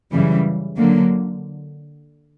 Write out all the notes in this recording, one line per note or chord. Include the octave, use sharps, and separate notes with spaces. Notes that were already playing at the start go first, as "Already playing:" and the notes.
F#2 C#3 E3 G3
D3 F#3 A#3